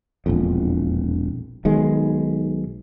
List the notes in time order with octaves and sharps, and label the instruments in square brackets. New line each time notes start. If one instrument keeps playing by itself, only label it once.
[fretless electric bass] E1 A#1 F2
B1 D#3 G#3